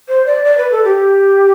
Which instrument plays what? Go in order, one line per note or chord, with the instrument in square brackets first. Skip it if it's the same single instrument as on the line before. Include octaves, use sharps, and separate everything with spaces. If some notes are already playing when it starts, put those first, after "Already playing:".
[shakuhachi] C5
D5
D5
B4
A4
G4